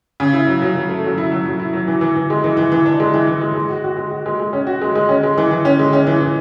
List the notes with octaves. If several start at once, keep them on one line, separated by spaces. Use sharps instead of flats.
C#3
E4
F#3
F#3
F#3
A3
F#3
E4
F#3
F#3
E4
F#3
E3
E3
E3
G#3
E3
E3
E3
D4
G#3
E3
E3
G#3
G#3
F#4
F#4
G#3
F#4
G#3
G#3
C#4
F#4
G#3
G#3
C#4
G#3
E3
E3
C#4
G#3
C#4
E3
E3